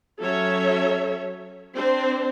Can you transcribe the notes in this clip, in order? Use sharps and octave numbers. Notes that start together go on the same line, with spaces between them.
F#3 C#4 A4 C#5 E5
C4 D4 C5